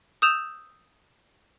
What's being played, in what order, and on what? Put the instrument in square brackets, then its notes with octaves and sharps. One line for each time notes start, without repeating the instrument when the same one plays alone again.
[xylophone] D#6 E6 G6 E7 F7